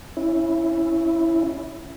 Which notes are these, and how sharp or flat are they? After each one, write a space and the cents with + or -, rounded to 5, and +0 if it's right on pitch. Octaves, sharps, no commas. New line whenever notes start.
C#4 +0 E4 +0